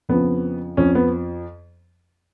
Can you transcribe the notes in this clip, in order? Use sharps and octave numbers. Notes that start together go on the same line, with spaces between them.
F2 C#3 F3 B3
F2 F3 C#4
B3